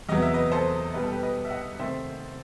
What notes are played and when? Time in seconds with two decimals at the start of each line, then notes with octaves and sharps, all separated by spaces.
0.09 E2 C3 F#3 B3 D#5
0.22 E5
0.34 B4 D#5
0.52 A4 C5
0.94 B2 G3 D#4 B4
1.03 A4
1.12 G4 B4
1.22 B4 D#5
1.45 E5
1.50 D#5 F#5
1.79 C3 D#3 A3 C4 C5 E5